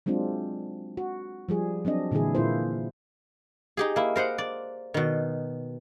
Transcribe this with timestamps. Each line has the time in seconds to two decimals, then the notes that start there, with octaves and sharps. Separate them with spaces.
0.06 F#3 G#3 C4 D4 F4
0.97 F#4
1.49 F3 G3 G#4
1.85 F#3 C4 D4 D#5
2.11 A#2 D3 E3 E4 G#4
2.35 A#2 A#3 E4 F4 C5
3.77 D#4 G4 G#4
3.96 A#3 E4
4.16 A#4 C5 D#5 F#5
4.38 D5
4.94 B2 D#3